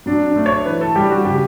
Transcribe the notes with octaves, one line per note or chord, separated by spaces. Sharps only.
F#3 D4
D4
A3
C#5
E3 B4
A4
G3 G4
F#4
C#3 G4